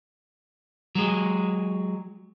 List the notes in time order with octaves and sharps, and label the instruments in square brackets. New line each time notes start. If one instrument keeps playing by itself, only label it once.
[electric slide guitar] F#3 G#3